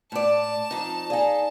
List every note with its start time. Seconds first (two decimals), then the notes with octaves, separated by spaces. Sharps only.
0.12 A2 D5 A5
0.71 F2 D#4
1.10 D#4 G#4 D5 F5 G#5